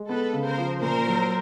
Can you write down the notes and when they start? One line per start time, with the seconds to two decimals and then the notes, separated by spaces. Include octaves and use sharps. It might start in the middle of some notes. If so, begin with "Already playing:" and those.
Already playing: G#3
0.09 B3 A4 B4
0.33 C#3
0.46 A#4 C5
0.58 F3
0.82 A#2 A#4 C5
1.07 F#3